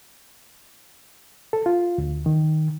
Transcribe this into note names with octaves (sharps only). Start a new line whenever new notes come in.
A4
F4
D2
D#3